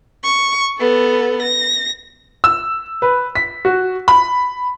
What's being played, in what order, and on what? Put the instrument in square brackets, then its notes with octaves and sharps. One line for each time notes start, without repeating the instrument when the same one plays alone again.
[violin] C#6
B3 A4
A#6
[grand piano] E6
B4
B6
F#4
B5